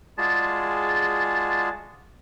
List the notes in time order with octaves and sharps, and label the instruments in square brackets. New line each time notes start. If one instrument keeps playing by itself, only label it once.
[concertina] G#3 F4 F#4 G#4 D5 A5